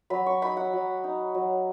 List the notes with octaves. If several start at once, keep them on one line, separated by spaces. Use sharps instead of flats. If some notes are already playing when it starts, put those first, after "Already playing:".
F#3 B5
C#6
D#4 B5
F#5
F#3
D#4
F#3